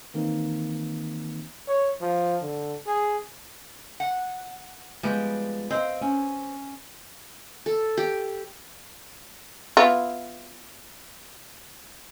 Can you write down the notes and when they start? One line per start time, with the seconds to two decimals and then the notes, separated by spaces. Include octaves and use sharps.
0.14 D#3 E3 A#3 C4 D#4 A#4
1.68 C#5
2.01 F3
2.42 D3
2.87 G#4
4.00 F#5
5.03 F3 G3 G#3 B3
5.71 C4 D#5 F5
6.01 C#4
7.66 A4
7.97 G4
9.77 B3 E4 F4